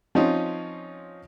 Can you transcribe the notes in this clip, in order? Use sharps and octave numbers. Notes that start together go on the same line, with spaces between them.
F3 C4 C#4 D#4 F4